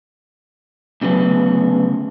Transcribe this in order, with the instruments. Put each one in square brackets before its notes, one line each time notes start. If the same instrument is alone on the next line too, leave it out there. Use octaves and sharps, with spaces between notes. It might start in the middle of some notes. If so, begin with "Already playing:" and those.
[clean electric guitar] D2 C#3 F#3 B3